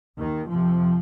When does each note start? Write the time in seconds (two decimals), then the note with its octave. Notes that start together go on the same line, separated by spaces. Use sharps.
0.18 D#2 D#3
0.49 F2 C3 F3